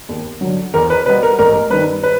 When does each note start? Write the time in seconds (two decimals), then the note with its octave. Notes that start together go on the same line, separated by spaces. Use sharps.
0.09 D#2
0.41 D3 F#3
0.74 E2 A#4
0.90 B4
1.06 B2 G3 B3 B4
1.23 A#4
1.39 A1 A#4
1.70 G2 D#3 B4
2.03 B4